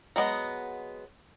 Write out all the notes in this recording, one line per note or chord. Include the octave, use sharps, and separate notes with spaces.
F#3 G#3 B3 D#5